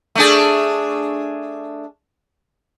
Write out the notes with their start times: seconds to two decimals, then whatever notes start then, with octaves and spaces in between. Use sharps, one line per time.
0.15 A3 D4 G#4